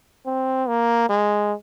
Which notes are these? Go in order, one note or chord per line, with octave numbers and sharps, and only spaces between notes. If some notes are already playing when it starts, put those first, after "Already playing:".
C4
A#3
G#3